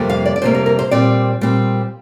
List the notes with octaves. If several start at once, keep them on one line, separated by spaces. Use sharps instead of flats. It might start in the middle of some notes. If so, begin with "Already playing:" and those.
Already playing: F2 C3 G3 A#3
F5
D5
D5
F2 C3 G3 A#3 C5
A#4
A#4
C5
A#2 G3 C4 D5
A#2 G3 C4